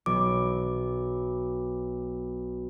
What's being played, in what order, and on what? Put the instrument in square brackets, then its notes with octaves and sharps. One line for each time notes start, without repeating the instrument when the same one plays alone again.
[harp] B1 [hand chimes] D6